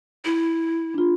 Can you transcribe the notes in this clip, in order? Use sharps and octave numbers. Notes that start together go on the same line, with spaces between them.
E4
D4 F4